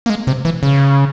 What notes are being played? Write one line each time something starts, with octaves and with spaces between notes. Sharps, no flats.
A#3
G#3
C3
E3
C#3